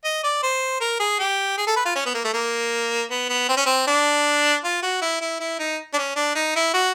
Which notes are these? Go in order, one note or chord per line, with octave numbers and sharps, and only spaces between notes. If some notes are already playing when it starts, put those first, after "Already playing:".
D#5
D5
C5
A#4
G#4
G4
G#4
A4
B4
F4
C#4
B3
A#3
A3
A#3
B3
B3
C4
C#4
C4
D4
F4
F#4
E4
E4
E4
D#4
D4
C#4
D4
D#4
E4
F#4